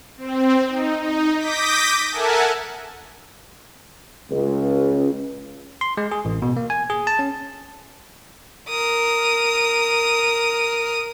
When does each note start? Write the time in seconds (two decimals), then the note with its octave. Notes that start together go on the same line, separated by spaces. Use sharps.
0.17 C4
0.68 D#4
1.02 D#4
1.37 D6 D#6 G6 A#6 B6
2.10 A4 A#4 E5 F#5 G#5 A5
4.31 C#2
5.81 C6
5.97 G#3
6.12 G#4
6.25 A1
6.42 B2
6.57 A#3
6.70 G#5
6.90 G#4
7.07 A5
7.19 C#4
8.69 A#4 D#6